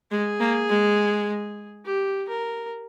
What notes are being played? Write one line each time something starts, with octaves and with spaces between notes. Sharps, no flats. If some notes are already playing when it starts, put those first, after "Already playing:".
G#3 G#4
A#3
G#3
G4
A#4